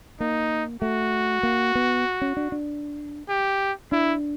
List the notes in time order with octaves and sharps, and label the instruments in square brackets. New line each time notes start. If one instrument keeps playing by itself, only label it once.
[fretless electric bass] A#3 [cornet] D#4
[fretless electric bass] A3 [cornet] F#4
[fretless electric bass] A#3
B3
C#4
D4
D4
[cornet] G4
[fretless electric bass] D4 [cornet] E4